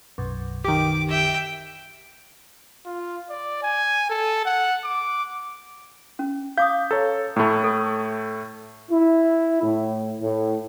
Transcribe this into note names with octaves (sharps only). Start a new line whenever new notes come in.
B1 F#2
D#3 G4 D6
E5 G5
F4
D5
G#5
A4
F#5
D6
C#4
F5 D6 D#6 G6
A4 C#5 A#5
A2 A3 A#5 B5
A4
E4
A2
A2